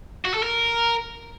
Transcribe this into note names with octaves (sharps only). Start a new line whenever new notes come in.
F#4
A4
A#4